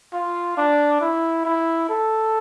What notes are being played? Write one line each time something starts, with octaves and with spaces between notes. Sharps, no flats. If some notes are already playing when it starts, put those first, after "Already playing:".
F4
D4
E4
E4
A4